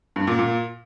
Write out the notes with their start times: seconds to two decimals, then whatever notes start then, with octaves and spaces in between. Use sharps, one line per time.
0.16 G2
0.27 A#2
0.39 A#2